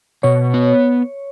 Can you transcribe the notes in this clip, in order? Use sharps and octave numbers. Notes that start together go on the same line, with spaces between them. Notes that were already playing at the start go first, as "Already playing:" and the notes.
B2 C#5
B3